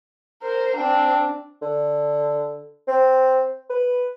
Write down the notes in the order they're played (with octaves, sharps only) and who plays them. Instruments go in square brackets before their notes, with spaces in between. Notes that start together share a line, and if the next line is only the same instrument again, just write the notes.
[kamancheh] A#4 C5
C4 D4
[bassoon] D3
C4
B4